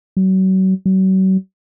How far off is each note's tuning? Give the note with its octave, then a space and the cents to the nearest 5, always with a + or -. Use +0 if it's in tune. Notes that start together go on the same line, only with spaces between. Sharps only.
F#3 +35
F#3 +40